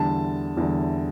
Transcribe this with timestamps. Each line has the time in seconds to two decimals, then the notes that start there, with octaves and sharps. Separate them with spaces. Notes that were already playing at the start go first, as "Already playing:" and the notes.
Already playing: E2 D3 G3 A5
0.57 E2 D3 G3